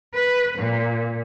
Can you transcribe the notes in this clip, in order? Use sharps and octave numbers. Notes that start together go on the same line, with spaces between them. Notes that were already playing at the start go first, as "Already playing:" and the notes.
B4
A#2